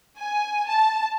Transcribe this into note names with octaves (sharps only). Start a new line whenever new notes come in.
G#5
A5